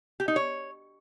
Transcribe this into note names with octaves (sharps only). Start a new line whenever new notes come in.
G4
D#4
C#5